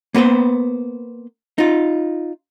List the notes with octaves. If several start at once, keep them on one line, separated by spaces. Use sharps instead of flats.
A#3 B3 B4 C5
D#4 F4